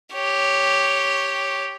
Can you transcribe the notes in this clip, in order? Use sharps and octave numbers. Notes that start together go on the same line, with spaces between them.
G4 C#5